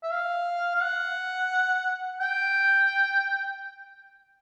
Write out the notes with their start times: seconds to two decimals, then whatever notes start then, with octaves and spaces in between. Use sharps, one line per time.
0.03 E5
0.12 F5
0.75 F5
0.82 F#5
2.20 G5